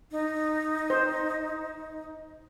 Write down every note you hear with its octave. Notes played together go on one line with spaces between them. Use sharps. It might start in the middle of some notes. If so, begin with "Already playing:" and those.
D#4
C5